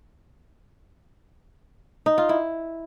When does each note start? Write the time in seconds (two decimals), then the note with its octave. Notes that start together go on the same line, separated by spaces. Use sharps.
2.06 D#4
2.18 F4
2.29 E4